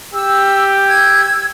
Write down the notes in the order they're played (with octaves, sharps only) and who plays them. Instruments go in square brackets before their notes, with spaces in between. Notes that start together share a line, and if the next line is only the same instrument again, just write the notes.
[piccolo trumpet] G4 [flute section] E6
[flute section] E6 G#6